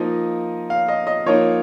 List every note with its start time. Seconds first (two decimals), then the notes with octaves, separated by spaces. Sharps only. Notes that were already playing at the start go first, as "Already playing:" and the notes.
Already playing: F3 A#3 D#4 D#5
0.70 F5
0.88 D#5
1.07 D#5
1.26 F3 A#3 D#4 C#5